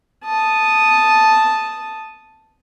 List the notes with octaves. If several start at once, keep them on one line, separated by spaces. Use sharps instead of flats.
A5 D#6